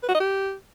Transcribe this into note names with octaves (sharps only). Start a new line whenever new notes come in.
B4
F#4
D#5
G4